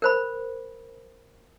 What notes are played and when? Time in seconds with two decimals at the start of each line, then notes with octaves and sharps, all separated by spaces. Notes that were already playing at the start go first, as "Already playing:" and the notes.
0.02 A#4 C5 B5